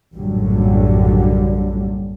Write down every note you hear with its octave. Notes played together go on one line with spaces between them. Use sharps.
A#1 F#2 A2 D3 F#3 G3